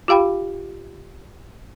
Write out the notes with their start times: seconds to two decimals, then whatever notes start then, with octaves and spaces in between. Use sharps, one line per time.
0.08 F4 G4 F5 G5 B5